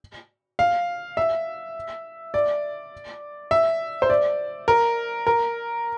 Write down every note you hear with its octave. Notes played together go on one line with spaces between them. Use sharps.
F5
E5
D5
E5
C5
D5
A#4
A#4